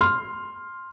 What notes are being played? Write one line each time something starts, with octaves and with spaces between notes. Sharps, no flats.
C6 F6